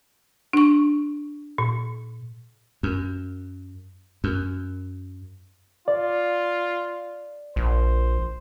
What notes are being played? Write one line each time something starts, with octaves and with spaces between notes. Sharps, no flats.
D4 C#6
A#2
F#2
F#2
F4 D5
A#1 C5